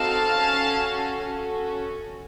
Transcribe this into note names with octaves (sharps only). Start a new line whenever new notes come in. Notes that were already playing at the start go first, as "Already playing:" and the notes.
Already playing: C4 D#4 F#4 A4 F5 A5
C#4 F#4 A4
C#4 F#4 A4